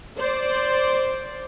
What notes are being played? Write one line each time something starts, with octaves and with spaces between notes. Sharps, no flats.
C5 D5